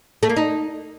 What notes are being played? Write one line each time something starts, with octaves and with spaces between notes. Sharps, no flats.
A3
A#3
D#4